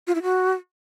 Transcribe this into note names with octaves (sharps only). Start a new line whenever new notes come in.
F4
E4
F#4